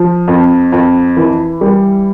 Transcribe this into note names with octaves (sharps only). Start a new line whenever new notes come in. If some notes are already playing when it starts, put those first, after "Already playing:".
Already playing: F3
F2
F2
E3
G3